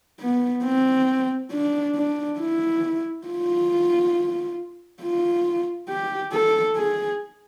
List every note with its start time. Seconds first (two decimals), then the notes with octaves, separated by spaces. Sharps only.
0.20 B3
0.64 C4
1.52 D4
1.96 D4
2.40 E4
3.27 F4
5.02 F4
5.89 G4
6.33 A4
6.77 G#4